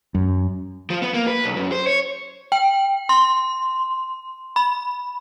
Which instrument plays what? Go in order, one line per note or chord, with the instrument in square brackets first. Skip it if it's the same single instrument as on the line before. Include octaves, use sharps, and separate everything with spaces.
[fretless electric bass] F#2
[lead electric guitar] F3
B3
A#3
B4
B1
F#2
C5
C#5
[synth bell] G5
C6
B5